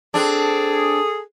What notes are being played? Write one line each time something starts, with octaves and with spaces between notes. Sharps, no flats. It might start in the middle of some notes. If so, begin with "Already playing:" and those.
C4 D4 G#4 A4